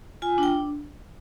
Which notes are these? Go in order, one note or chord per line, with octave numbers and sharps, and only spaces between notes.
F4 G#5
D4 G5